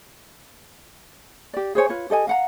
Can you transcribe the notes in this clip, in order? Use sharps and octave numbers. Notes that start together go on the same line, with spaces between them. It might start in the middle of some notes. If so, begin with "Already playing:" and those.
G4 D5
G#4 C5 C#5 G#5
F4 B4 C#5
G4 A4 D#5 G#5
F5 F#5 A#5